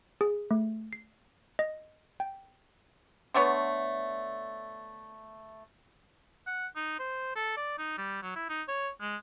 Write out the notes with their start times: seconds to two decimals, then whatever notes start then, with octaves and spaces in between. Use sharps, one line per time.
0.21 G#4
0.51 A3
0.93 C7
1.59 D#5
2.20 G5
3.34 D3 A3 B3 C#5
6.47 F#5
6.76 D#4
6.99 C5
7.36 A4
7.57 D5
7.78 D#4
7.98 G3
8.22 F#3
8.36 E4
8.49 D#4
8.68 C#5
9.01 G#3